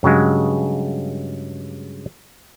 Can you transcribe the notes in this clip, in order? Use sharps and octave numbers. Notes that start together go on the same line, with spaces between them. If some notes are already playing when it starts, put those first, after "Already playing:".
G2 C#3 F#3 G#3